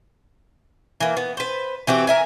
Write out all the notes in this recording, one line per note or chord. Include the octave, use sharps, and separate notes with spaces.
E3 A#3
B3
B4 C5
E3 C4 F#4 G4
A#4 E5 G#5